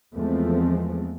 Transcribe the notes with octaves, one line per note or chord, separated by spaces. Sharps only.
E2 F3 G#3 A3 C4